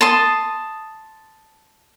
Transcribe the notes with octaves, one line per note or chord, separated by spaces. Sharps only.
A5 C6 D#6